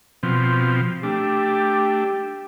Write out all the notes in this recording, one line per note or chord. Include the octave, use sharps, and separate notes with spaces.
B2 F3 C4
A3 D4 G4